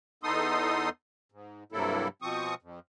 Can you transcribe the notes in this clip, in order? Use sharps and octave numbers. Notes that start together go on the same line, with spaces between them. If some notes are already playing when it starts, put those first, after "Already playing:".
E2 B3 D#4 A4 C6 D#6
G#2
G2 C3 F#3 A#3 E4 A4
B2 F3 C4 C#6 D#6
F2